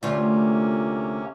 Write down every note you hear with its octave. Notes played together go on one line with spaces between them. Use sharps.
D2 C3 A#3 C#4 F4